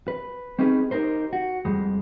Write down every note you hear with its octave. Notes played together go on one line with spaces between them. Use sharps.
B4
C4 C#4 D#4 G4 G#4 B4
D#4 F4 G4 A#4 C5
F#4
F2 G3 G#3